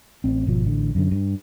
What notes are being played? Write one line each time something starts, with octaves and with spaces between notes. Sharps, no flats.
A1 C4
G#1 B2 F3
A1 A2 D3
F#2 D3
G2